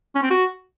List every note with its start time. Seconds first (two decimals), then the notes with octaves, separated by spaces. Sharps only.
0.15 C#4
0.23 C4
0.30 F#4